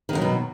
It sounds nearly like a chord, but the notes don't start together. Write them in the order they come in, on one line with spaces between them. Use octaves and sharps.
D#3 D3 F#3 B2